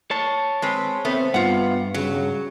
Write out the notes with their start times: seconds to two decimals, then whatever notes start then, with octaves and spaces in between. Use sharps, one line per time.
0.11 C#5 A5
0.62 G#3 C4 B4
1.05 C3 A3 B3 C4
1.34 G2 B3 F4 F#5
1.94 C#3 F#3